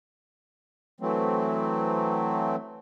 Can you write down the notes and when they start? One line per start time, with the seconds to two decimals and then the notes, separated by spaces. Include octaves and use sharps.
1.00 E3 F#3 A3 C4